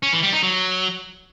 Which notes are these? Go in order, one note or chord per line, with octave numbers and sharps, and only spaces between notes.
C#4
E3
G3
D#4
F#3